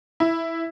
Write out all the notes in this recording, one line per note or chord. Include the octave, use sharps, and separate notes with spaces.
E4